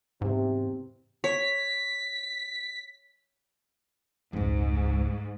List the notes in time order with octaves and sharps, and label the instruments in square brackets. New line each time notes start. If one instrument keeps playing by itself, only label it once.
[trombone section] E2 C3 [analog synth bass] G#2
[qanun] C#5 [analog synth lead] B6
[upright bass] F1 C#2 [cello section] G#2